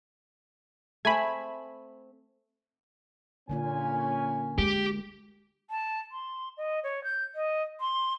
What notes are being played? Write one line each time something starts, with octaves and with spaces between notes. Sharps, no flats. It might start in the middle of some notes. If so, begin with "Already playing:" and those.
A3 C4 G#5 B5
A#2 D3 A#3 C#4 F4 G#5
G#3 G4
A5
C6
D#5
C#5
G6
D#5
C6